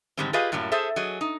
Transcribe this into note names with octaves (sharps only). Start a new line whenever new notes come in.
G#2 D3 D#3 G3 G#3 C4
F4 G4 G#4 B4 D#5 F5
F#2 A2 F#3 G3 A#3
G#4 A4 C5 E5
F#3 G#4 D#5
D#4